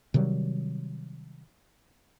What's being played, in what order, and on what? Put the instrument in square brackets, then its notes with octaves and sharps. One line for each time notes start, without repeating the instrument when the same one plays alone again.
[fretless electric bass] C3 D#3 F#3 G3